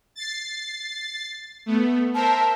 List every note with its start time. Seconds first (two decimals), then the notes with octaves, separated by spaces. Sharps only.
0.15 A6 C7
1.66 A3 B3
2.15 A#4 C5 E5 A5